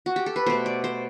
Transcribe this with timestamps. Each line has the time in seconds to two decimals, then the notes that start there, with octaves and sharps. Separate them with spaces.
0.06 F#4
0.16 G4
0.26 A4
0.36 B4
0.46 B2 A3 C5
0.66 D5
0.84 C5